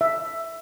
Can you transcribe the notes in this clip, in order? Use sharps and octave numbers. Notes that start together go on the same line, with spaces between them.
E5